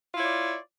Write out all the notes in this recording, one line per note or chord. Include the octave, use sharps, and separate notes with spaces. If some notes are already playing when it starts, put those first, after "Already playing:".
E4 F4 C#5 D5